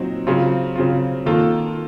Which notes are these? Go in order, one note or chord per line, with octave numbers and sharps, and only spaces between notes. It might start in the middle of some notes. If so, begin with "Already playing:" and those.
Already playing: A#2 F#3 C4 D#4
C#3 F#3 C4 F4
C#3 F#3 C4 F4
D#3 A#3 F4 A4